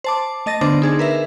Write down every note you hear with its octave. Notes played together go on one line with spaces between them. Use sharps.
C5 A5 D6
A3 D#5 A6 A#6
D3 B3 D4 C5 D6
D#4 G#4 C5
A#4 B4 E5